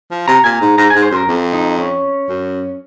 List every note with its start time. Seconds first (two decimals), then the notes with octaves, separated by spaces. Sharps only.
0.11 F3
0.28 C3 A#5
0.44 A#2 G#5
0.53 A#5
0.61 G#2
0.77 G#2 A#5
0.90 G#2 G#5
1.02 C5
1.11 F#2 A#4
1.28 F2
1.53 D#4
1.79 C#4
2.29 F#2